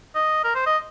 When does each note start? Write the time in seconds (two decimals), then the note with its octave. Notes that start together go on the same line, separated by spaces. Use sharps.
0.15 D#5
0.44 A#4
0.55 C5
0.66 D#5